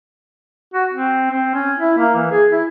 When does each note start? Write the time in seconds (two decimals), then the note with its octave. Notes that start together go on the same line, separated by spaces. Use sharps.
0.74 F#4
0.93 C4
1.31 C4
1.54 C#4
1.77 E4
1.98 A#3
2.16 E3
2.31 G#4
2.51 E4